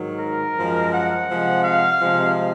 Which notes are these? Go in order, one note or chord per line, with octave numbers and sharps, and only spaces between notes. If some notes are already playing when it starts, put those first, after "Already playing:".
Already playing: G#2 D#3 F#3
A#4
F#2 F3 G#3
F#5
C3 F3 G#3
F5
C3 F3 G#3